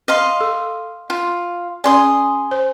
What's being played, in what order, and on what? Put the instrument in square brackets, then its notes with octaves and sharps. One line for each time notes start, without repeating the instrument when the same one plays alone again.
[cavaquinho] D#5 F5 C6
[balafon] A4
[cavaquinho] F4
[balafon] C#4 D5 [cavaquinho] G#4 C6 D#6
[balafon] C5